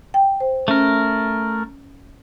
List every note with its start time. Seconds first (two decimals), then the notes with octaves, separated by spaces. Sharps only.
0.14 G5
0.40 C5
0.68 A3 C#4 A#4